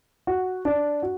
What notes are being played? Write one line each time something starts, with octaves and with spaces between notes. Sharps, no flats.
F#4
D4
F#4